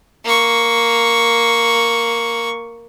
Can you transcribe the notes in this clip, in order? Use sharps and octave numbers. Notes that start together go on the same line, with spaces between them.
A#3 C#6